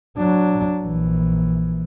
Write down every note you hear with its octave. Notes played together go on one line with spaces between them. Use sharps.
F#3 D4
A#1 E3